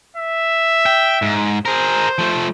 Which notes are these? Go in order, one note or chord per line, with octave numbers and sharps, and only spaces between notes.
E5
G5
G#2
G#4 A#4 C5
F3 A3